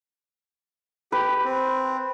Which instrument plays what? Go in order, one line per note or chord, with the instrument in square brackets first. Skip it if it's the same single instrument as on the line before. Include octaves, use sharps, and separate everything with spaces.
[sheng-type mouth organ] G4 [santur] B4
[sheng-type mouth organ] C4